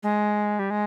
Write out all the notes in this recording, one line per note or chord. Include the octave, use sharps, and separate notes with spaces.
G#3
G3
G#3